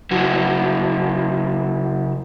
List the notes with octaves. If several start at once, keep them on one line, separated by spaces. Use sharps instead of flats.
C#3 F#3 E4 F#4